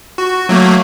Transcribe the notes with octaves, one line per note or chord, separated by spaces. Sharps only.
F#4
F#3 A3 A#3